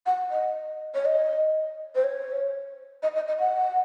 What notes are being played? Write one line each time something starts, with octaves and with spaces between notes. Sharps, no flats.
F#5
D#5
C#5
D#5
C5
C#5
D#5
D#5
D#5
F#5